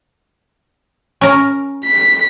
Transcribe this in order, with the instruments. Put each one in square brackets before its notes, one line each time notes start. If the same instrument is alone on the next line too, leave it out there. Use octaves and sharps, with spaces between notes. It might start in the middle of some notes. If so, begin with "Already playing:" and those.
[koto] C#4 A#4
[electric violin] B6